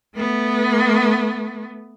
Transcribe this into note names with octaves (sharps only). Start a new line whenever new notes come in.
A3 B3